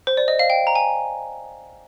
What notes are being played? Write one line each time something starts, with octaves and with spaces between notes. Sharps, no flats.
C5
D5
D#5
F5
G5
A#5
G#5